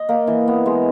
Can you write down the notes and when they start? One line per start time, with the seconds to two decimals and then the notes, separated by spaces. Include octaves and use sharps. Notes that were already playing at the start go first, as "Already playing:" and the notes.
Already playing: D#5
0.09 A#3
0.27 E3
0.48 B3
0.66 G#3